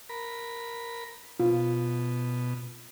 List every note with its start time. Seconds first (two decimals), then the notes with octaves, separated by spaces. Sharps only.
0.09 A#4 B5
1.40 B2 F4